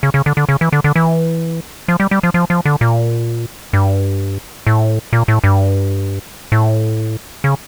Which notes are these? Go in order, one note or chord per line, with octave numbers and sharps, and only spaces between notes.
C#3
C#3
D3
D3
C#3
E3
D3
D3
E3
F3
G3
G3
F3
F3
F3
D3
A#2
G2
A2
A#2
A2
G2
A2
C#3